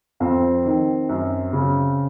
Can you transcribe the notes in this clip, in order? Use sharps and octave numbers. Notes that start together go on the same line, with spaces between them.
F2 C4
D#3
F#2
C#3